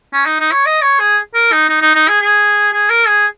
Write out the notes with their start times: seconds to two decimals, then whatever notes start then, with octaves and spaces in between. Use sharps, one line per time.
0.13 C#4
0.26 D#4
0.40 D#4
0.52 C#5
0.66 D#5
0.82 C#5
0.99 G#4
1.34 A#4
1.52 D#4
1.69 D#4
1.81 D#4
1.95 D#4
2.08 G#4
2.21 G#4
2.73 G#4
2.90 A#4
3.07 G#4